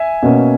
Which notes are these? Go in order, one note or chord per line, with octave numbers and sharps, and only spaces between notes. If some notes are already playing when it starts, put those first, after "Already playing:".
Already playing: E5 G#5
B2 A#3 C#4